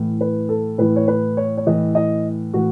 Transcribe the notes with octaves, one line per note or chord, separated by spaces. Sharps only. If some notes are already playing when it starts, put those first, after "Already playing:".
Already playing: A2 E3
B4
A4
A2 E3 B4
C#5
B4
C#5
C#5
A2 E3 D#5
D#5
A2 E3 F#4